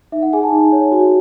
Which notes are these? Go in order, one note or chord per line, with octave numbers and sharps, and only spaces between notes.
D#4 E5
F#5
G#4 G#5
A5
D#4
C#5
F#4